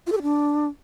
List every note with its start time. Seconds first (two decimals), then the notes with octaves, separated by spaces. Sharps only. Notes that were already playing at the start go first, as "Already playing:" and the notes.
0.07 F4
0.12 A4
0.17 G4
0.22 D4